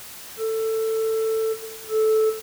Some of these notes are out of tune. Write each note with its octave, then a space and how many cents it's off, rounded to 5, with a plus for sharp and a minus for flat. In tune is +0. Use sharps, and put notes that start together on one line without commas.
A4 +15
A4 -10